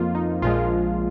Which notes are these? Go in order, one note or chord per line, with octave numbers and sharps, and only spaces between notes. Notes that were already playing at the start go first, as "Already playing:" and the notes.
Already playing: F2 F3 A#3 D#4 F4
D#4
A#1 A#2 F3 G#3 F4